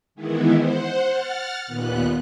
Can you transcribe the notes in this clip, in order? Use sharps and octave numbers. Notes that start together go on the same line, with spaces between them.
D#3 E3 G#3 B3 E4
C5 F#5
F#5 F6 A6
D#2 A#2 B3 F#6